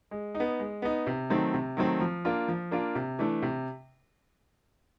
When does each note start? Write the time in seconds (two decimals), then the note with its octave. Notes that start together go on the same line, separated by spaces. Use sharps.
0.11 G#3
0.35 D#4
0.40 B3
0.59 G#3
0.82 B3 D#4
1.07 C3
1.30 D#3 F#3 A3 C4
1.54 C3
1.77 D#3 F#3 A3 C4
2.00 F3
2.25 A#3 D4 F4
2.48 F3
2.71 A#3 D4 F4
2.95 C3
3.19 E3 A3 D4
3.42 C3